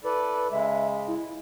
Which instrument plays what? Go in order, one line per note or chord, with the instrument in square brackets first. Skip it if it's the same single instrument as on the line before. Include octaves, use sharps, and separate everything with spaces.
[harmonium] E4 A4 D5 [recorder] B4
[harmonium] C#3 G#3 [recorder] E5
[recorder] E4